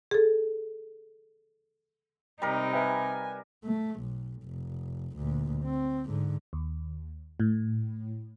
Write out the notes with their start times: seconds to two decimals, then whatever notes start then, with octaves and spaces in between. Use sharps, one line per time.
0.11 G#4 A4
2.42 C3 G3 D#4 A#4
2.72 B4 E5 G5 G#5
3.65 A3
4.01 B1
4.44 F1
5.17 D2 A#2
5.64 C4
6.06 G#2 D3
6.53 D#2
7.40 A2